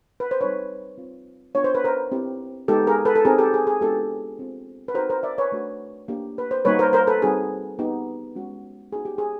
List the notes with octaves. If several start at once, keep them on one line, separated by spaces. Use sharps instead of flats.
B4
C5
G3 C4 D#4 B4 C#5
C4 F4
B3 D4 F4 C#5
C5
B4
A#4 C5
C4 E4 G4
G#3 B3 D#4 G4 A4
G#4 A#4
A4 B4
A4
C4 D#4 G4 G#4 A#4
G4 A4
G#4
G#4
G#3 B3 D4 F4 G4 A4
C4 F4
B4
C4 D#4 F#4 A#4 C5
A#4 C5
D5 E5
B4 C#5
A3 D4 F#4
A#3 D4 G4
B4
C5
G3 A#3 D#4 F#4 B4 C#5
A#4 C5
A#4 C5
A4 B4
G3 C4 D#4 F#4 G#4
B3 D#4 G4
G#3 C#4 F#4
B3 D#4 F#4 G#4
G4
G#4